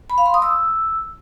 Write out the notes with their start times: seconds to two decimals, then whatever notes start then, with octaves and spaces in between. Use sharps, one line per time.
0.10 B5
0.18 F5
0.26 C6
0.34 D#6
0.42 E6